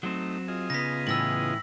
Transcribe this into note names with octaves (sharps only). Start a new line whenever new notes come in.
F#3 A3 C4 D#4
F4 G#4 D#5
C#3 B3 A#6 B6
A2 E3 E6 A#6 F#7